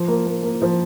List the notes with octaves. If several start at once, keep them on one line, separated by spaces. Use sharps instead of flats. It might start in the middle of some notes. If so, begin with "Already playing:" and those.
Already playing: F3
A#3
A#3
A#3
F3